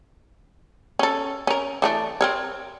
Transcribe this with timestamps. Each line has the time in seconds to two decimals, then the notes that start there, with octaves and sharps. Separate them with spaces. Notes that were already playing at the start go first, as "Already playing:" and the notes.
0.99 C#4 A4
1.47 C#4 A#4
1.82 E3 A3 D4
2.21 C4 A#4 C#5